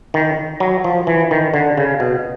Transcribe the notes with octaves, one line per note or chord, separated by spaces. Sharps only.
D#3
F#3
F3
E3
D#3
D3
C#3
B2